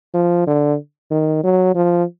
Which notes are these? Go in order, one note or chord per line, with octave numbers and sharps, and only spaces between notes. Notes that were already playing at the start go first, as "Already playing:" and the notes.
F3
D3
D#3
F#3
F3